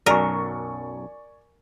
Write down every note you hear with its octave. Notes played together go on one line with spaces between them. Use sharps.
B1 F#2 A#4 D5 G#5 C#6